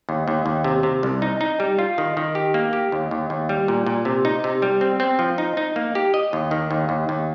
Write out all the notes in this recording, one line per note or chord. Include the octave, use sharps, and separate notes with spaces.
D#2
D#2
D#2
C3
C3
C2
D#4
D#4
G3
F4
D#3
D#3
G4
A#3
G4
D#2
D#2
D#2
G3
A#2
A#2
C3
D#4
C3
G3
C4
C4
F3
D#4
D#4
A#3
G4
D#5
D#2
D#3
D#2
D#2
D#2